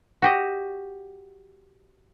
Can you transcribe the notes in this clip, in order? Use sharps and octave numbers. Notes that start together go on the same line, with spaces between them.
F#4 G4 D#5